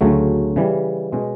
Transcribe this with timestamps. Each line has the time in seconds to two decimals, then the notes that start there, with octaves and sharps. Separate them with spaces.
0.01 D2 C#3 F#3 A3
0.56 C#3 E3 G3
1.12 B2 G#3 C#4